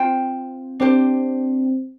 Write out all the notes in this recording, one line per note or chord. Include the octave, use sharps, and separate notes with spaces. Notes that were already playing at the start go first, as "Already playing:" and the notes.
Already playing: C4 F4 C5 G5
C4 D4 G4 C5